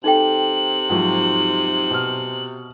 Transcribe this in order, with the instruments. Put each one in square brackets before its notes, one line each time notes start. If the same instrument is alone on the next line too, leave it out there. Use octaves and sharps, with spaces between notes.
[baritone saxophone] C3 [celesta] D#4 A4 G5 [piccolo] F#7
[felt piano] G#2 F3 F#3
B2 F6